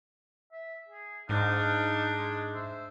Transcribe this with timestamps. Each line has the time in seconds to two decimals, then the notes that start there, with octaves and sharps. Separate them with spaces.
0.52 E5
0.89 G#4
1.29 G#2 D4 D#4 F5
2.19 G#3
2.54 C5 E5